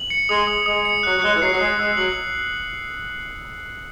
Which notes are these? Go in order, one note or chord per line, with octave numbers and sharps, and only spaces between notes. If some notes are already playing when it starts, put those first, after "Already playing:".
Already playing: F#7
C#7
G#3 D#6
D#6
G#3 D#6
C#7
F#3 F#6
F#3
G#3 F#6
E3
F#3 C7
F#3
G#3 C7
G#3 E6
F#3 F#7